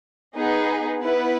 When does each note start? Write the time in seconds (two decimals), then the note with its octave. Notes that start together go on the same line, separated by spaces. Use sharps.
0.34 B3 D#4 G#4 B4
0.99 B3 E4 B4